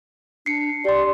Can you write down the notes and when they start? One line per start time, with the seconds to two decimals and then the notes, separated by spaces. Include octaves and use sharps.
0.46 D4 C7 C#7
0.85 G4 D5 C6